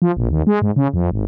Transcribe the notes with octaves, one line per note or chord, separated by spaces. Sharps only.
F3
A#1
D#2
G#3
G#2
C#3
F2
G#1